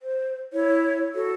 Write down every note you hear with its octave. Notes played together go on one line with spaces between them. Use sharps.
C5
E4 C#5
F#4 A4